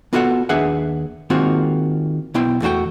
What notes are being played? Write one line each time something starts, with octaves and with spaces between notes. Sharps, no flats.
B3 F4 F#4 A4 F5 F#5
D#2 D4 G#4 B4 E5 F#5
D#3 G#3 A#3 C4 F4 F#4
B1 B3 E4 C5 G5 C6
E2 A3 F#4 A4 G5